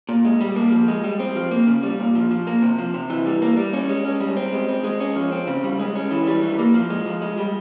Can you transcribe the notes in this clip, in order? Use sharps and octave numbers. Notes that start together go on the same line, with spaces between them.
A#2
G#3
G3
A#3
F3
G#3
G3
C4
F3
A#3
C#3
G3
A#2
F3
F3
A#3
C3
F3
C3
E3
G3
A#3
G3
C#4
G#3
C#4
G3
C4
G#3
C4
G#3
C#4
F3
C4
C#3
G3
G#3
C#4
E3
G3
E3
A#3
F3
G#3
F3
G#3
G3